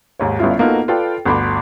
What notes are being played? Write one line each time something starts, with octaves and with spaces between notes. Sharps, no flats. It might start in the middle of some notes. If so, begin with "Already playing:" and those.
D#2 G#2 C#5
G1 G2 C#4 E4 F4
A#3 B3 D#4 F4 F#4 A4
F4 A4 B4 D5 G5
G1 D2 B5 C6 D6